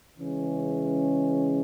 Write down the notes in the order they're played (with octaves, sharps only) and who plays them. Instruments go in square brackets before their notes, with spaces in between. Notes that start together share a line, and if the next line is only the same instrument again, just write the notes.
[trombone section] C#3 E3 G#3 C#4